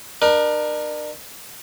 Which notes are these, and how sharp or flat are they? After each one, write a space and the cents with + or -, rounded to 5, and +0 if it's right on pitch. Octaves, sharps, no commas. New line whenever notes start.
D4 +40 A#4 +25